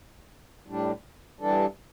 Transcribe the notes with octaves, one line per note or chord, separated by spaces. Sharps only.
A2 G3 D4
G2 E3 G3 D4 A4